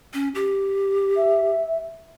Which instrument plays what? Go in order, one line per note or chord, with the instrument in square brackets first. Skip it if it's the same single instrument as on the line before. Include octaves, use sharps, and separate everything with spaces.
[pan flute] C#4
G4
[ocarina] E5